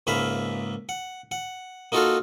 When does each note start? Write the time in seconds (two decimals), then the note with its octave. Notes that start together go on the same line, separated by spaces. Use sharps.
0.07 C#2 G#2 A#3 E5 F5 B5
0.89 F#5
1.31 F#5
1.92 A#3 D#4 F4 F#4 A4 F5